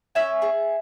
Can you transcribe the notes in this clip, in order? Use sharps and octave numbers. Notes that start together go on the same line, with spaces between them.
C#4 E5 G#5
G#4